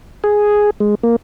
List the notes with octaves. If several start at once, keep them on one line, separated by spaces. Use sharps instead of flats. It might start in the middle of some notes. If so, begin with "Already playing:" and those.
G#4
G#3
A#3